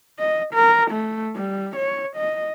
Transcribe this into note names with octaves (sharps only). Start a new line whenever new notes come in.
D#5
A#4
A3
G3
C#5
D#5